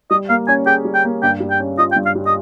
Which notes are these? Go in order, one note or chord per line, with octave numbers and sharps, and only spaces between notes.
G3 D#5
A#3 F5
C#4 G#5
G#4 G5
G3
G5
A#3
G2 G5
G3
G5
C#4
F4 D#5
G5
G2
F5
G3
D#5